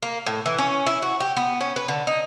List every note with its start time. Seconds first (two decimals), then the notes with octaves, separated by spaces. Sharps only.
0.02 A#3
0.26 A2
0.46 E3
0.58 C#4
0.86 E4
1.02 F#4
1.20 G4
1.37 B3
1.61 C#4
1.76 B4
1.88 D3
2.07 D#4